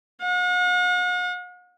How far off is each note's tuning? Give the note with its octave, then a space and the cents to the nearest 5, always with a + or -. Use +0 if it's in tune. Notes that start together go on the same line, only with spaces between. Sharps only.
F#5 -45